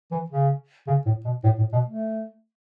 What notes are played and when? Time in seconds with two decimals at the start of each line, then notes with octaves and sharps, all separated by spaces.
0.11 E3
0.30 C#3
0.87 C#3
1.06 A2
1.25 B2
1.44 A2
1.58 A2
1.73 B2
1.86 A3